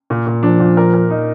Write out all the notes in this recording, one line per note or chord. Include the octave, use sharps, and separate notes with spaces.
A#2
A#2
F3 D4
A#2
A#4
A#4
D#4